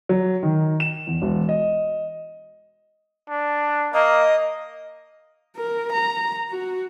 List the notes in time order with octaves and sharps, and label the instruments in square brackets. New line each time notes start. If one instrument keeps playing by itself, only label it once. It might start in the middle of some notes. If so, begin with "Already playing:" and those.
[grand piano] F#3
D#3
E7
E2
E1
D#5
[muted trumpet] D4
[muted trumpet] A#3 [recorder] D#5
[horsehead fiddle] A#4
A#5
F#4